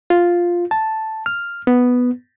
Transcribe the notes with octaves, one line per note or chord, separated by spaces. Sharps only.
F4
A5
F6
B3